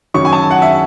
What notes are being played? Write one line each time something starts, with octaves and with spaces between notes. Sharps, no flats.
F#2 D#3 F#3 C#4 C#6
G#5
A5
F#5
E5